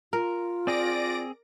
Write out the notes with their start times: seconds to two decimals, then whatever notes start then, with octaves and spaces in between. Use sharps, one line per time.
0.13 F4 A#4
0.67 C4 G#4 D5 A#6 D7